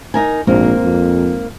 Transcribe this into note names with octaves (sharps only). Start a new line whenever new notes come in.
D#4 A#4 G#5
A#1 G#2 A#3 C4
F2